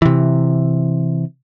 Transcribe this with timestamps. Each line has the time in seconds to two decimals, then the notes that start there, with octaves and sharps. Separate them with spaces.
0.02 C3 E3